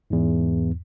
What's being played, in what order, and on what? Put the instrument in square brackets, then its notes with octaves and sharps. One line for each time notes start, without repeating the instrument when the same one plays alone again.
[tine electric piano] E2 G#2